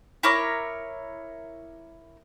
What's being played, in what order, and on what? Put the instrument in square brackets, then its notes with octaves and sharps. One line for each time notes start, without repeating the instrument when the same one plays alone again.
[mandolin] E4 A#4 C#5 D6